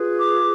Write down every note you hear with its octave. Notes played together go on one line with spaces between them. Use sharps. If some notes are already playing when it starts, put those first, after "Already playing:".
Already playing: F4 G#4 B4
D6